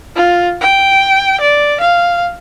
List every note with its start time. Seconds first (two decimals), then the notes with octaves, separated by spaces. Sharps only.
0.16 F4
0.61 G5
1.41 D5
1.81 F5